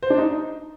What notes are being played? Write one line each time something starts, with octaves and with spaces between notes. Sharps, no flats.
C5
D4
D#4